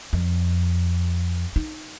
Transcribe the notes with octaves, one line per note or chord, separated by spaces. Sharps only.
F2
D#4